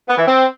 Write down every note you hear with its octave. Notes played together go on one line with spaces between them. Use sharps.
B3
E3
C4